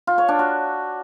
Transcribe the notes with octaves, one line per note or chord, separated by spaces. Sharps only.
F4
C#5
D4
F#4